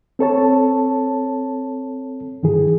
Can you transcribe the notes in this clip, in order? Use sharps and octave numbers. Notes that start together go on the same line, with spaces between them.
C4 A4 C#5 A5
G2 D#3 E3 G#4